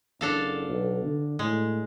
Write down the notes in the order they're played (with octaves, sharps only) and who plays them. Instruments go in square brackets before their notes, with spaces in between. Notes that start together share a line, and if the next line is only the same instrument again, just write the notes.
[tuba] F#1 [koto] D4 A4 F5
[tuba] B1
D3
[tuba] A2 [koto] G#3